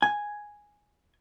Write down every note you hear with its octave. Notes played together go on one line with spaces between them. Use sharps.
G#5